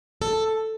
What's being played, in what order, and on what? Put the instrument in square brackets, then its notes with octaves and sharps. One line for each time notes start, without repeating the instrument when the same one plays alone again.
[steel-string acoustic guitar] A4